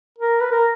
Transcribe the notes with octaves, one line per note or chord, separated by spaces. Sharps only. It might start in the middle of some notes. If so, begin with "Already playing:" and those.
A#4
B4
A#4